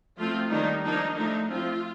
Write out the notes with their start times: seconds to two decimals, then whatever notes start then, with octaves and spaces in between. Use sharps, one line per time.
0.17 F3 A3 C4 F4
0.50 D#3 G3 A#3 D4 D#4
0.83 F3 A#3 D4 D#4
1.16 F3 A3 D4 D#4
1.48 F3 A3 C4 F4